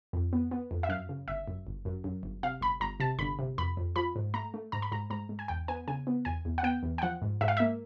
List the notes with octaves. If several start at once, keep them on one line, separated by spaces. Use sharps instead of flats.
F2
B3
B3
F2
E5
F#2 F5
C#3
G1 E5
F#2
G1
F#2
F#2
G1
C3 F5
G1 B5
G1 A#5
C3 A5
G1 B5
C3
F2 B5
F2
F3 B5
G#2
A3 A#5
A3
G#2 A#5
B5
G#2 A#5
G#2 A#5
G#2
G#5
E2 G5
B3 G#5
C#3 G#5
B3
E2 G#5
E2
F#5
B3 G5
E2
G5
F3 F#5
G#2
G#2 E5
F5
E5
A#3